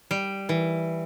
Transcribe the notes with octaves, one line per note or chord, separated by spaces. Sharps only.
G3
E3